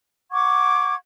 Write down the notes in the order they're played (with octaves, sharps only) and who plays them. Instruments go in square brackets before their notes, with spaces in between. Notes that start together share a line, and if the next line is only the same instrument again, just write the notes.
[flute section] F#5 C#6 D6 G#6